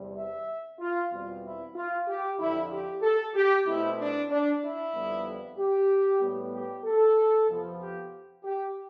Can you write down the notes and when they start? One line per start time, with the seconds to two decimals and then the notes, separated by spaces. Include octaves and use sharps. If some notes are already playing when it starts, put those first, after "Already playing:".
Already playing: E2 C3 G3 C4
0.16 E5
0.79 F4
1.11 E2 B2 G3 C4 F4
1.43 E4
1.75 F4
2.08 G4
2.39 F2 D3 F3 E4
2.71 G4
3.02 A4
3.34 G4
3.66 B2 A3 C4 E4
3.99 D4
4.30 D4
4.62 E4
4.93 F2 D3 G3 B3
5.57 G4
6.21 A2 G3 B3
6.54 G4
6.84 A4
7.48 F2 C3 F3 B3
7.80 G4
8.44 G4